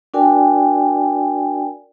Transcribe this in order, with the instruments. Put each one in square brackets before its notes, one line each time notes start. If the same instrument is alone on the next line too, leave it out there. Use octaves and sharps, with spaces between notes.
[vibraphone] D4 F#4 A#4 D5 G5 G#5